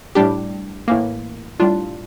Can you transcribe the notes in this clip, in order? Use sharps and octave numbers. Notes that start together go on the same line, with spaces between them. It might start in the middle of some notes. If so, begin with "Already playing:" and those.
A2 G3 D4 G4
A2 E3 A#3
A2 G3 D4 F4